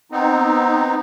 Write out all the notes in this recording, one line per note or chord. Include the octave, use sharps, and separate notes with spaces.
B3 C4 D#4